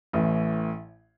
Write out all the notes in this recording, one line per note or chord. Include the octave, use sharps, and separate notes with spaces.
A1 A2 E3